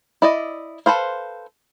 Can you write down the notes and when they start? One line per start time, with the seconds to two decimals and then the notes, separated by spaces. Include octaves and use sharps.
0.22 E4 D5 D#5
0.86 A4 B4 C5 F5